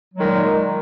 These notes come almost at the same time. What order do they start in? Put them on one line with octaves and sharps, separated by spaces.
F#3 G#3 D#3 A#2